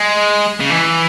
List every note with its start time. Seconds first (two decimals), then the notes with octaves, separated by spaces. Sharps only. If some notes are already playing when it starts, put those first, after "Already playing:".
Already playing: G#3
0.60 C#3
0.70 E3